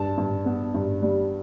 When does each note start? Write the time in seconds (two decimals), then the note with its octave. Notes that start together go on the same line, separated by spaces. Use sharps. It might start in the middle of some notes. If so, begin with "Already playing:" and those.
Already playing: G2 A5
0.17 G2
0.45 B3
0.74 G2
1.02 G3